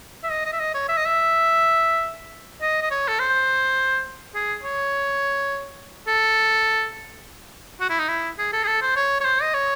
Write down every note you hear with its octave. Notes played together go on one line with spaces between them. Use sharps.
E5
D#5
D#5
E5
D#5
C#5
E5
D#5
E5
D#5
D#5
C#5
A4
C5
G#4
C#5
A4
F#4
E4
D#4
E4
G#4
A4
G#4
A4
C5
C#5
C#5
C5
D#5
C#5